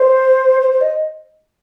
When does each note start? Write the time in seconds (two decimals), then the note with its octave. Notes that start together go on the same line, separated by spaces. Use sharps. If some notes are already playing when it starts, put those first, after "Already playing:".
Already playing: C5
0.60 C5
0.71 C5
0.80 D#5